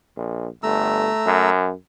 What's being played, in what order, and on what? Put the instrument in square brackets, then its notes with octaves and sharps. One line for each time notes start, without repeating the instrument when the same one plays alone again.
[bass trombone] A#1
[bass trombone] G1 [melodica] A3 A#5 E6
[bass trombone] F#2